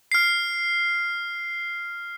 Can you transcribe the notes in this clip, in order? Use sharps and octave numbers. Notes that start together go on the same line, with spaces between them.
F6 C7